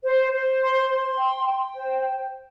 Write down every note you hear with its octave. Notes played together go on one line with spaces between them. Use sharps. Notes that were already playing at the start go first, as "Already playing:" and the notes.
C5
C5
C6
C6
G5
G5
C5